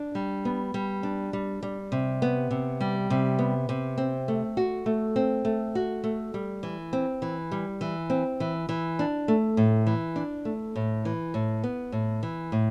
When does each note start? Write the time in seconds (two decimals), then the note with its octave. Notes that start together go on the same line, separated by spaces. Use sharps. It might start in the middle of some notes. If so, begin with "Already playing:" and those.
Already playing: D4
0.15 G3
0.45 B3
0.74 G3
1.03 D4
1.33 G3
1.63 G3
1.92 C3
2.22 B3
2.51 C3
2.80 G3
3.10 C3
3.39 B3
3.69 C3
3.98 C4
4.28 A3
4.57 F#4
4.86 A3
5.16 C4
5.45 A3
5.75 F#4
6.04 A3
6.34 G3
6.63 E3
6.93 C4
7.22 E3
7.52 G3
7.81 E3
8.10 C4
8.40 E3
8.69 E3
8.99 D4
9.28 A3
9.57 A2
9.87 E3
10.16 D4
10.45 A3
10.76 A2
11.05 E3
11.34 A2
11.64 B3
11.92 A2
12.23 E3
12.52 A2